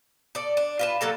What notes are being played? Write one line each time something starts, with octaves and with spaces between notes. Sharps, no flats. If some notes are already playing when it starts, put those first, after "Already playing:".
A4 D5
D4
F4 B4 A5
F#3 A#3 A4 A5